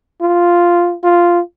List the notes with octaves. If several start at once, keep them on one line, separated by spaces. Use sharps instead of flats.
F4
F4